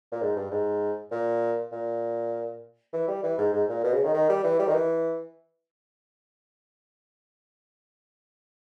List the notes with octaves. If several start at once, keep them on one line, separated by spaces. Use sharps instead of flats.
A#2
G#2
G2
G#2
A#2
A#2
E3
G3
E3
G#2
G#2
A#2
B2
C#3
D#3
D#3
G3
E3
G3
D#3
E3